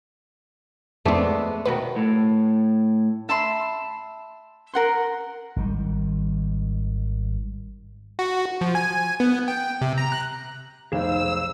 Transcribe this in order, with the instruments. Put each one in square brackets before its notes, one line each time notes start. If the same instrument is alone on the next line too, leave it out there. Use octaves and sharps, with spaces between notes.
[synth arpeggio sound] F2 C4 [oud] G#3 B3 D5 [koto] A3
[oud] B2 D#3 F#4 [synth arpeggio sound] B4
[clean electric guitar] A2
[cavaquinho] E5 A5 B5 C6
A#4 F#5 C6
[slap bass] G#1 D#3 G3
[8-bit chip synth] F#4
F3
G#5
B3
G5
C3
A#5
F#6
[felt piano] F1 B1 E7 [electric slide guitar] G#4 C5 [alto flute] F5 [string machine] E6